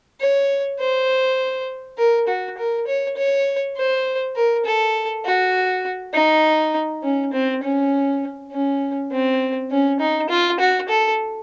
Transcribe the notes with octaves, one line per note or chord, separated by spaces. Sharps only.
C#5
C5
A#4
F#4
A#4
C#5
C#5
C5
A#4
A4
F#4
D#4
C#4
C4
C#4
C#4
C4
C#4
D#4
F4
F#4
A4